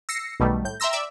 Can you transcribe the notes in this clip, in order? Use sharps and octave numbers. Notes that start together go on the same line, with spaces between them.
E6 A#6 C7 C#7
B1 B2 D#3 G3 A3
A2 G6
E5 G5 A#5 C6 E6 A#6
D5 E5 D6 E6